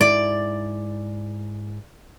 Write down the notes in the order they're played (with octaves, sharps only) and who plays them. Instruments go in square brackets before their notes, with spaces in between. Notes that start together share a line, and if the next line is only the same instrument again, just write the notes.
[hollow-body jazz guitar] G#2 E4 [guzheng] D5